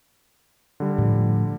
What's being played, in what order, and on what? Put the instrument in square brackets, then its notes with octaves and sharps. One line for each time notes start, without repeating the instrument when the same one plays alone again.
[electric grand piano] D3 G3
[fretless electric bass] A2 F3